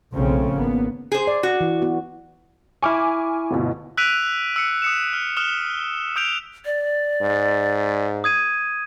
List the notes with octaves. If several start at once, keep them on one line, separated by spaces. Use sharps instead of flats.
B1 C#3 F3 A3 C4
G#1 A#3 B3
G#4 C5
D5
F#4
E3
B3 F#4
E4 G#5 C#6 D6 F6
G1 D2 B2
E6 F#6 B6 D7 D#7 F7
E6 C#7
D#6 C#7 E7
F6
D#6 F6 F#6 E7 G7
D#6 F6 G6 D7 E7 F7
D5
G#2
D#6 G#6 D#7